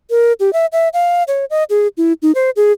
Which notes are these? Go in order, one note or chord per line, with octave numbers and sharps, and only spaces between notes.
A#4
G4
E5
E5
F5
C#5
D#5
G#4
E4
D#4
C5
G#4